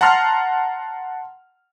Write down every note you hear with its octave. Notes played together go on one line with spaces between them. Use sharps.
F#5 A5 A#5 C6 F6